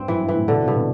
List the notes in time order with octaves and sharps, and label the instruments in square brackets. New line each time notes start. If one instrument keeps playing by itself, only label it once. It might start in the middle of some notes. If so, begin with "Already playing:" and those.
Already playing: [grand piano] G2 [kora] C4
[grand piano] F#2 [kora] E3
[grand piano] G2
[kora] E3
[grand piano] A2
[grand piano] B2 [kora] D3
[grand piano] C3
[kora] G2
[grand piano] B2